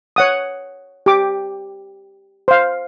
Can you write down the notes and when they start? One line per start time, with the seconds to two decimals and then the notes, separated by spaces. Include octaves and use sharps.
0.16 C#5 F#5 D#6
1.06 G4 D6
2.48 C5 F5